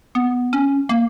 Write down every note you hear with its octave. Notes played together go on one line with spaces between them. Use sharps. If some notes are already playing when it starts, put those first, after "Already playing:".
B3
C#4
A#3